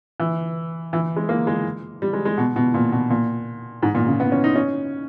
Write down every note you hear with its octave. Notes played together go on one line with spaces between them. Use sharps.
E3
E3
G#3
A#3
G#3
G3
G#3
G#3
B2
B2
A#2
B2
A#2
G#2
A#2
C#3
B3
C#4
D#4
C#4